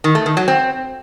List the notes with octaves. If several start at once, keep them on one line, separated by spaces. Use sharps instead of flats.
D#3
A3
D#3
F#3
C4